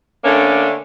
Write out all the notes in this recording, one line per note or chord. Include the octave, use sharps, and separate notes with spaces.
D3 A3 A#3 C#4 D4